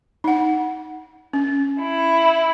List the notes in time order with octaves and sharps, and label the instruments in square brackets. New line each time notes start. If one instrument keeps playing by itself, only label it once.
[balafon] D#4 F#5
C#4
[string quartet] E4